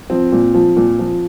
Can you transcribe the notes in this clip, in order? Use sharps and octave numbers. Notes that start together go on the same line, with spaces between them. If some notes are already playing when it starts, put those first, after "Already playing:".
F3 C4
A#2
F3
A#2
F3